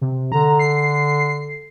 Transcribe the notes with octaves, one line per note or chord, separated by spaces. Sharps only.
C3
D3 A#5
C7